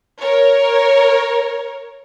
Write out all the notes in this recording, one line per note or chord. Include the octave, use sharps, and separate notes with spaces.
A#4 C#5